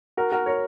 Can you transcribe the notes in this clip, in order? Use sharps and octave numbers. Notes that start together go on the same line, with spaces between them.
F#4 A#4
F#4 A#4
A#4 C#5